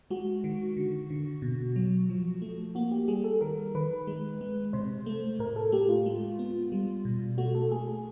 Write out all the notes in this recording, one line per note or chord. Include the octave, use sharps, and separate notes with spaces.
G#3 F#4
D#3
D3
D3
B2
F#3
F3
A3
A#3 F#4
G4
G3 G#4
A4
D#3 A#4
D#3 B4
G#3
G#3
C3 C5
A3
A2 A#4
A4
A3 G4
F4
G#3
B3
G3
B2
A3 F#4
A4
A3 G#4
G#4